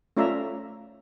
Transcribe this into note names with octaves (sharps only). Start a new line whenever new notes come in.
A3 C#4 F4 D5 E5 A#5